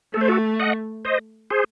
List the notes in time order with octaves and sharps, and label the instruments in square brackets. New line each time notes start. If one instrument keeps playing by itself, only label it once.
[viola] A3 [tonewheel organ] A4
[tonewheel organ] C5
F#4 A4
D#5 F#5
C5 D#5
G#4 C5